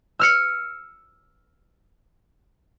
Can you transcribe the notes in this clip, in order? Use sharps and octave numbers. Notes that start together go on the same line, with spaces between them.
E6 F6 C#7